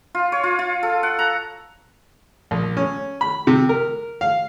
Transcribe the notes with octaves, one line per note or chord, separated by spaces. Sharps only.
F4
C#5
F4
F4
A4
F#5
A#5
A#1
C#4
B5
C3
A#4
F5